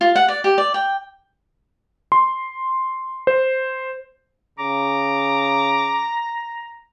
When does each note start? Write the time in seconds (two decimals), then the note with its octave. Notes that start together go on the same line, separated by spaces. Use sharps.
0.01 F4
0.16 F#5
0.28 D5
0.44 G4
0.58 D5
0.74 G5
2.12 C6
3.27 C5
4.59 C#3 A#5 D6